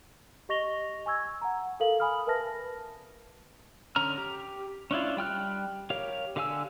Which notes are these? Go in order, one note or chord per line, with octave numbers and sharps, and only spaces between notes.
G4 D#5 C#6 A#6 F7 G7
G#5 C#6 E6 G#6
F#5 G#5 A#5
A4 A#4 F5 F#7
G#5 B5 D#6 F6
A#4 B4 E5 A5 F6 A#6
D3 C#4 A#5 F6
G4
C#4 D4 E4 F4
G3 G5 F6 F#6
G4 A#4 C#5 F5
D3 G4 F5 G#5 E6